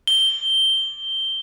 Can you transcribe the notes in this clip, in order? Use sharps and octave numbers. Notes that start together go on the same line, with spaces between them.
G7